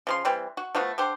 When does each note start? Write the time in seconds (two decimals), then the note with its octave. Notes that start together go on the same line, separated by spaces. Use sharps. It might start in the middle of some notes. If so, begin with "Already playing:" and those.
0.07 C#3 F3 C6
0.25 E3 G3 C4
0.57 F#4
0.75 F3 A3 B3 F#4
0.98 D3 G4 C5